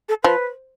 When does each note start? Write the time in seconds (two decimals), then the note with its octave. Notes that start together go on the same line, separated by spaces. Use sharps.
0.09 A4
0.23 F3 B4